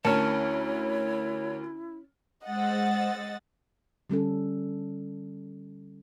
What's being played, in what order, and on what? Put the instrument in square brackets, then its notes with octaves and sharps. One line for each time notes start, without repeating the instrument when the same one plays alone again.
[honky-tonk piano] D2 A#4 C#7 [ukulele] C#4 A5 [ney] E4 [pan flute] C#5
[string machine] G#3 C5 E6 [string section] D#5 F#5 A6
[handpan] D3 G3 C#4 A4